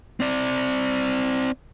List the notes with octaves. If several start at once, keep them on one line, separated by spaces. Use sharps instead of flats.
C4 D5